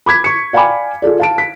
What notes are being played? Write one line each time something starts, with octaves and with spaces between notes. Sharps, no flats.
B5 D6 G#6 B6
C#6 C#7
D5 F5 G5 G#5 B5 D6
F4 G#4 A4 D5
F5 A5 D7
B6